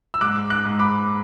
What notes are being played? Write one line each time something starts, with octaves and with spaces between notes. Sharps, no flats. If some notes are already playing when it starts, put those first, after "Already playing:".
E6
G#2 D6 F#6
D6 F#6
G#2
B5 D6